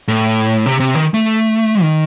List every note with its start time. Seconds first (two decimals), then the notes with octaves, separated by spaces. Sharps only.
0.08 A2
0.66 C3
0.80 C3
0.95 D#3
1.14 A3
1.82 D#3